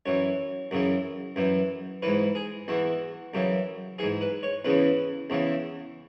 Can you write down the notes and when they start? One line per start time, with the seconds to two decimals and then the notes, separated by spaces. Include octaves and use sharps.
0.06 F#2 E3 C#5
0.71 F#2 C#3 E3
1.36 F#2 E3
2.02 G#2 E3 B4
2.35 G#4
2.68 E2 E3 F#4
3.34 F#2 C#3 E3
3.98 G#2 E3 G#4
4.21 B4
4.43 C#5
4.65 E2 C#3 E3 B4
5.30 E2 C#3 E3